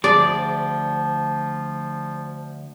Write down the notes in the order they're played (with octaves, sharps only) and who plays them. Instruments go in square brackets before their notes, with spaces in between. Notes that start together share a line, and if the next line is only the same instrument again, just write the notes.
[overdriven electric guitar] D2 [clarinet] F3 [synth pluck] G#4 [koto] D5